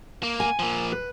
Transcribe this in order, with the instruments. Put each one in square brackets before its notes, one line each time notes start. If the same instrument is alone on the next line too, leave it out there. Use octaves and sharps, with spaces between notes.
[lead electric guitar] A#3
[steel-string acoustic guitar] G#5
[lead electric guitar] F3 A#3
[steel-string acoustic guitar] B4